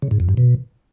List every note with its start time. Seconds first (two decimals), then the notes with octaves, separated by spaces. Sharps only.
0.02 C#3
0.11 G#2
0.20 F2
0.29 G2
0.37 B2